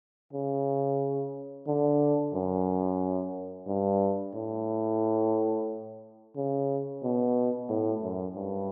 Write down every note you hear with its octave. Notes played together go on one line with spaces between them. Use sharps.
C#3
D3
F#2
G2
A2
C#3
B2
A2
F#2
G2